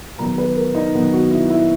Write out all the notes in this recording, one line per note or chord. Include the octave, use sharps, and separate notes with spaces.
D#3 F#3 B3 A#5
B4
A#4
D#4
D#3 F#3 B3
F#4
E4
E4